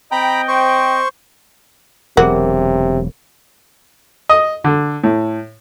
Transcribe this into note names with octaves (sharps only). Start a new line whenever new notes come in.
C4 D#5 G5 A#5 B5
C5 C#6
E1 C3 F#3 F#4 G#4 A#4
D#5
D3
A2